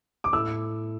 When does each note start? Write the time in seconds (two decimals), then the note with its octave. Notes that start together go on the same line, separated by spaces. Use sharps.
0.24 D6
0.33 A2 A3 E4 A4 E6